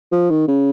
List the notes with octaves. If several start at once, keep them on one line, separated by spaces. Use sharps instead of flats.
F3
D#3
C#3